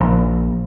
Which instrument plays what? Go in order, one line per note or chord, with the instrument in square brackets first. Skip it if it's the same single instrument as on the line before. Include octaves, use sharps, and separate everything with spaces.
[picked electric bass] A#1